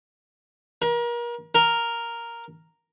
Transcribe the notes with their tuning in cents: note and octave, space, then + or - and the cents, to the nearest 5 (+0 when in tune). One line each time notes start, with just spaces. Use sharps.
A#4 +35
A#4 +0